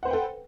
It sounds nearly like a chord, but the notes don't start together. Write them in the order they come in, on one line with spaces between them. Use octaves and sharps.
F#5 C5 B4 G5 A4